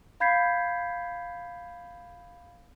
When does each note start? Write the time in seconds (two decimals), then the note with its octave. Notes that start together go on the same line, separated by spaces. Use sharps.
0.20 F5 B5 G6 G#6 B6 C7